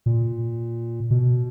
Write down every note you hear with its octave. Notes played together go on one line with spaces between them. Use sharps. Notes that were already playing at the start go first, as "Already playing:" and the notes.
A#2
B2